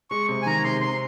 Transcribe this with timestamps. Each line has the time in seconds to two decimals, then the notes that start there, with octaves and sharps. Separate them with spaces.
0.11 G#3 C#6
0.29 C3
0.42 G#5
0.46 D#3 A#5
0.64 C3 C6
0.81 C4 C6